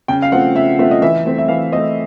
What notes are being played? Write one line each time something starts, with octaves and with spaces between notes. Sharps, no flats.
C#3 G5
F5
F3 A3 C4 F#5
C#3 E5
F3 A3 C4 E5
D#5
E3 E5
A3 C4
E5
E3 F5
C4 D#5
A3